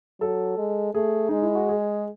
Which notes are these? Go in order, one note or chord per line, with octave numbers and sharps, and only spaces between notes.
F#3 A4
G#3
A3 G#4
G#3 D#4
E4
F#4
G#4